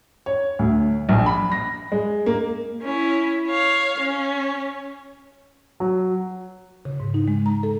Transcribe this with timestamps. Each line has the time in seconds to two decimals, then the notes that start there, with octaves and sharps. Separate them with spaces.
0.26 C#5
0.59 D2
1.09 A#1
1.26 B5
1.52 A#6
1.92 G#3
2.26 A#3
2.82 C#4 E4
3.48 C#5 F5
4.00 C#4
5.80 F#3
6.85 C#3
7.00 G#2
7.14 D#4
7.28 G#3
7.46 A#5
7.63 A4